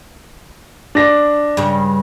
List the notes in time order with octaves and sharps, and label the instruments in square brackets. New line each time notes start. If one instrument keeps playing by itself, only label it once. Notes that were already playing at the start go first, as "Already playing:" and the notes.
[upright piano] D4 A#6
[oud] G2 C#3